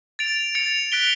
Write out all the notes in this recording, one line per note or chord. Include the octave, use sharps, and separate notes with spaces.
A6 D7 F7
A6 C#7 F7
F#6 B6 D7 G7